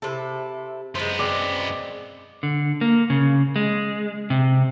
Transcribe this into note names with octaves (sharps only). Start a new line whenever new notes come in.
C3 E4 A4
F#2 G#3 B3 C5
G#3 C4 D5
D3
A#3
C#3
G#3
C3